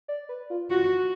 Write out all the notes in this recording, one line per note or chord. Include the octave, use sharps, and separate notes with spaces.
D5
B4
F4
F4 F#4